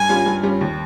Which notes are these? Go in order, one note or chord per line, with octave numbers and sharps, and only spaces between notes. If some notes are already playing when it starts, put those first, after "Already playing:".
Already playing: G2 G#5
G3 C#4 F4
G2
G3 C#4 F4
D#2